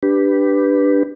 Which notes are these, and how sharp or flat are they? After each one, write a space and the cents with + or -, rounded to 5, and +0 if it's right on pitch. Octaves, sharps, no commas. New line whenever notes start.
D4 +0 G4 +0 B4 +0